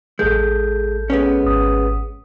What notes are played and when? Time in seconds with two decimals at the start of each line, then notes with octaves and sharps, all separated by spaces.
0.19 A1 G#3 A4 G6
1.10 G#3 B3 C#4
1.44 G#1 D#6